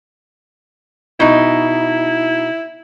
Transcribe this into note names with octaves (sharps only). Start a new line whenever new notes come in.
B2 D#4 E4